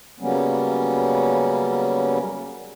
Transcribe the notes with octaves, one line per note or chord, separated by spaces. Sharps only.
C#3 F#3 G3 A#3 B3 C#4